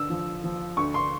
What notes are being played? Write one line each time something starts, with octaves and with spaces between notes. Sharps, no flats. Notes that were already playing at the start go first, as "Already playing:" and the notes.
Already playing: D3 E6
F3
F3
D2 C#6
C6